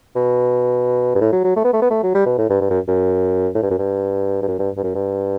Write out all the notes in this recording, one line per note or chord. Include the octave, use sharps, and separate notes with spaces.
B2
G2
A2
F#3
F#3
A3
B3
A3
B3
A3
F#3
G3
B2
A2
G2
G2
F#2
F#2
A2
G2
F#2
G2
G2
F#2
G2
G2
F#2
G2